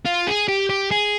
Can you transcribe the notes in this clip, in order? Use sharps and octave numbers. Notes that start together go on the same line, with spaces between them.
F4
G#4
G4
G4
G#4